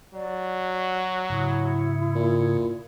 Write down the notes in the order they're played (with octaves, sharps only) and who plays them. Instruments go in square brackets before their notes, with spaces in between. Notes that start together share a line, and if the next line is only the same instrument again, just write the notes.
[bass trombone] F#3 [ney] D5
[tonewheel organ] G#2 C#3 [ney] E4
[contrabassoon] A#2